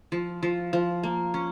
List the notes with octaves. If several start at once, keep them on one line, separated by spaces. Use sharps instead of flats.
F3
F3
F3
A#3
C#4